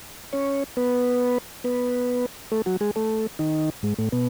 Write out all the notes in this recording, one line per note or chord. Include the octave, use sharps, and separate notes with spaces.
C#4 C#5
B3 B4
B3 B4
A3 A4
F#3 F#4
G#3 G#4
A3 A4
D#3 D#4
G#2 G#3
A2 A3
B2 B3